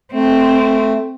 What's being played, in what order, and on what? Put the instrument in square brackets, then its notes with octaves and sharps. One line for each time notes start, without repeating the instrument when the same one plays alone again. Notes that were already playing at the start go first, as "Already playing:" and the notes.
[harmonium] A3 [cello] C4